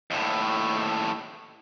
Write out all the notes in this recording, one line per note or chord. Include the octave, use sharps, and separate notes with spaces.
D#2 A2